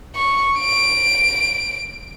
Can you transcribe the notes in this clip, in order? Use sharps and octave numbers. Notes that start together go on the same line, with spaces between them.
C#6
D7